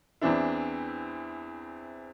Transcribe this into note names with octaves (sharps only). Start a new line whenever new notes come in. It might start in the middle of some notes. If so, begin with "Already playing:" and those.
E2 E3 C4 D4 E4